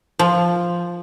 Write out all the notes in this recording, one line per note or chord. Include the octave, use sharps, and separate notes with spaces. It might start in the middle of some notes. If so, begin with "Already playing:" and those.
F3